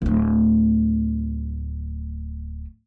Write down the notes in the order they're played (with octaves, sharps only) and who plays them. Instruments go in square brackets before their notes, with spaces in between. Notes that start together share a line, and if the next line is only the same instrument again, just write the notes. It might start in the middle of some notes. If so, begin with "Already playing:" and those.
[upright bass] D1 A3